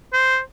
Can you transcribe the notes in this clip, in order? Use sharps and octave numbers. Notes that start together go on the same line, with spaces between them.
C5